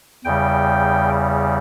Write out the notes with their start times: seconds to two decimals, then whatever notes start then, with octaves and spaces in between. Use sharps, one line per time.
0.25 E2 C#3 G3 G5